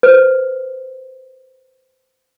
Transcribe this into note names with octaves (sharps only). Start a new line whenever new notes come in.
B4 C5